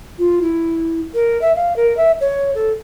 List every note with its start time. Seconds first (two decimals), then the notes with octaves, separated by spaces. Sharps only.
0.18 F4
0.41 E4
1.14 A#4
1.41 E5
1.55 F5
1.76 A#4
1.97 E5
2.20 C#5
2.55 A4